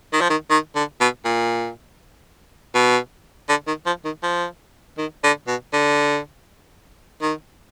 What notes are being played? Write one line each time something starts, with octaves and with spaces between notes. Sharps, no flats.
D#3
F3
D#3
D#3
D3
B2
A#2
B2
D3
D#3
F3
D#3
F3
D#3
D3
B2
D3
D#3